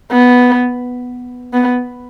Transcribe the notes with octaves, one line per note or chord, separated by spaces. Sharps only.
B3
B3